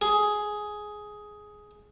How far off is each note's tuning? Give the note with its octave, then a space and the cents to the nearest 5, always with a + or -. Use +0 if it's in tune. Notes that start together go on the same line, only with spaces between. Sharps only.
G#4 +10